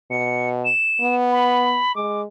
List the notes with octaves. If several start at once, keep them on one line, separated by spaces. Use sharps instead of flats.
B2 C#7
E7
B3
B5
G#3 D6